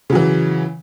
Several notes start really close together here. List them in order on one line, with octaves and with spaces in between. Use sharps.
C#3 F#3 E3